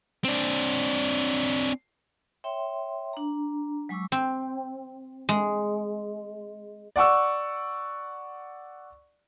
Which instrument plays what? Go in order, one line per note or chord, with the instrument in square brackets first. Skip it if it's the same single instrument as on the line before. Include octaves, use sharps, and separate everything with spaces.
[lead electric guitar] C4 D4
[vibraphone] C#5 E5 G5 C6
D4 A#5
F#3 G#3 G#5 C#6 D6 E6
[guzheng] C4
G#3
[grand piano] D5 F#5 C#6 E6